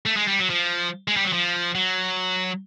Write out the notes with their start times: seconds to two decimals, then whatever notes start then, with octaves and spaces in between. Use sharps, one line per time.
0.06 A3
0.17 G#3
0.28 G3
0.39 F#3
0.50 F3
1.08 G#3
1.17 G3
1.25 F#3
1.33 F3
1.75 F#3